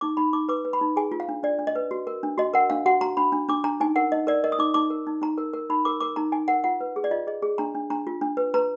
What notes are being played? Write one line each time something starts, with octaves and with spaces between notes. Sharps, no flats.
D#4 D6
D#4 B5
D#4 D6
B4 D6
B4
B5
D#4
G#4 G#5
F4
F5
D4
D4 D5
D4
D#5
B4
F#4
A#4
D4
F#4 D#5
A#4 F#5
D4 F5
F#4 F#5
F#4 A#5
D4 B5
D4
D4 D6
D4 A#5
D#4 G#5
A#4 F#5
D#4 D#5
A#4 D5
A#4 D#5
D#6
D#4 D6
D#4 D6
A#4
D#4
D#4 A#5
A#4
A#4
D#4 B5
A#4 D6
A#4 D6
D#4 A#5
D#4 G#5
A#4 F#5
F4 F#5
B4
G#4
D5
F4 D#5
G#4 D#5
G#4
D4 A#5
D4
D4 A#5
F4
D4
B4
B4 A#5